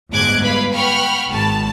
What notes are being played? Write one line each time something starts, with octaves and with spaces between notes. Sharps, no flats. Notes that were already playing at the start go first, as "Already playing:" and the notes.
G1 D2 G#2 D6 F#6 G#6
B4 F5 B5
F#5 G5 B5 C#6 F6
G#1 A5